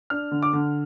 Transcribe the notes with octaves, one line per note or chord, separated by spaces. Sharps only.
D4 F6
D3
D6
D3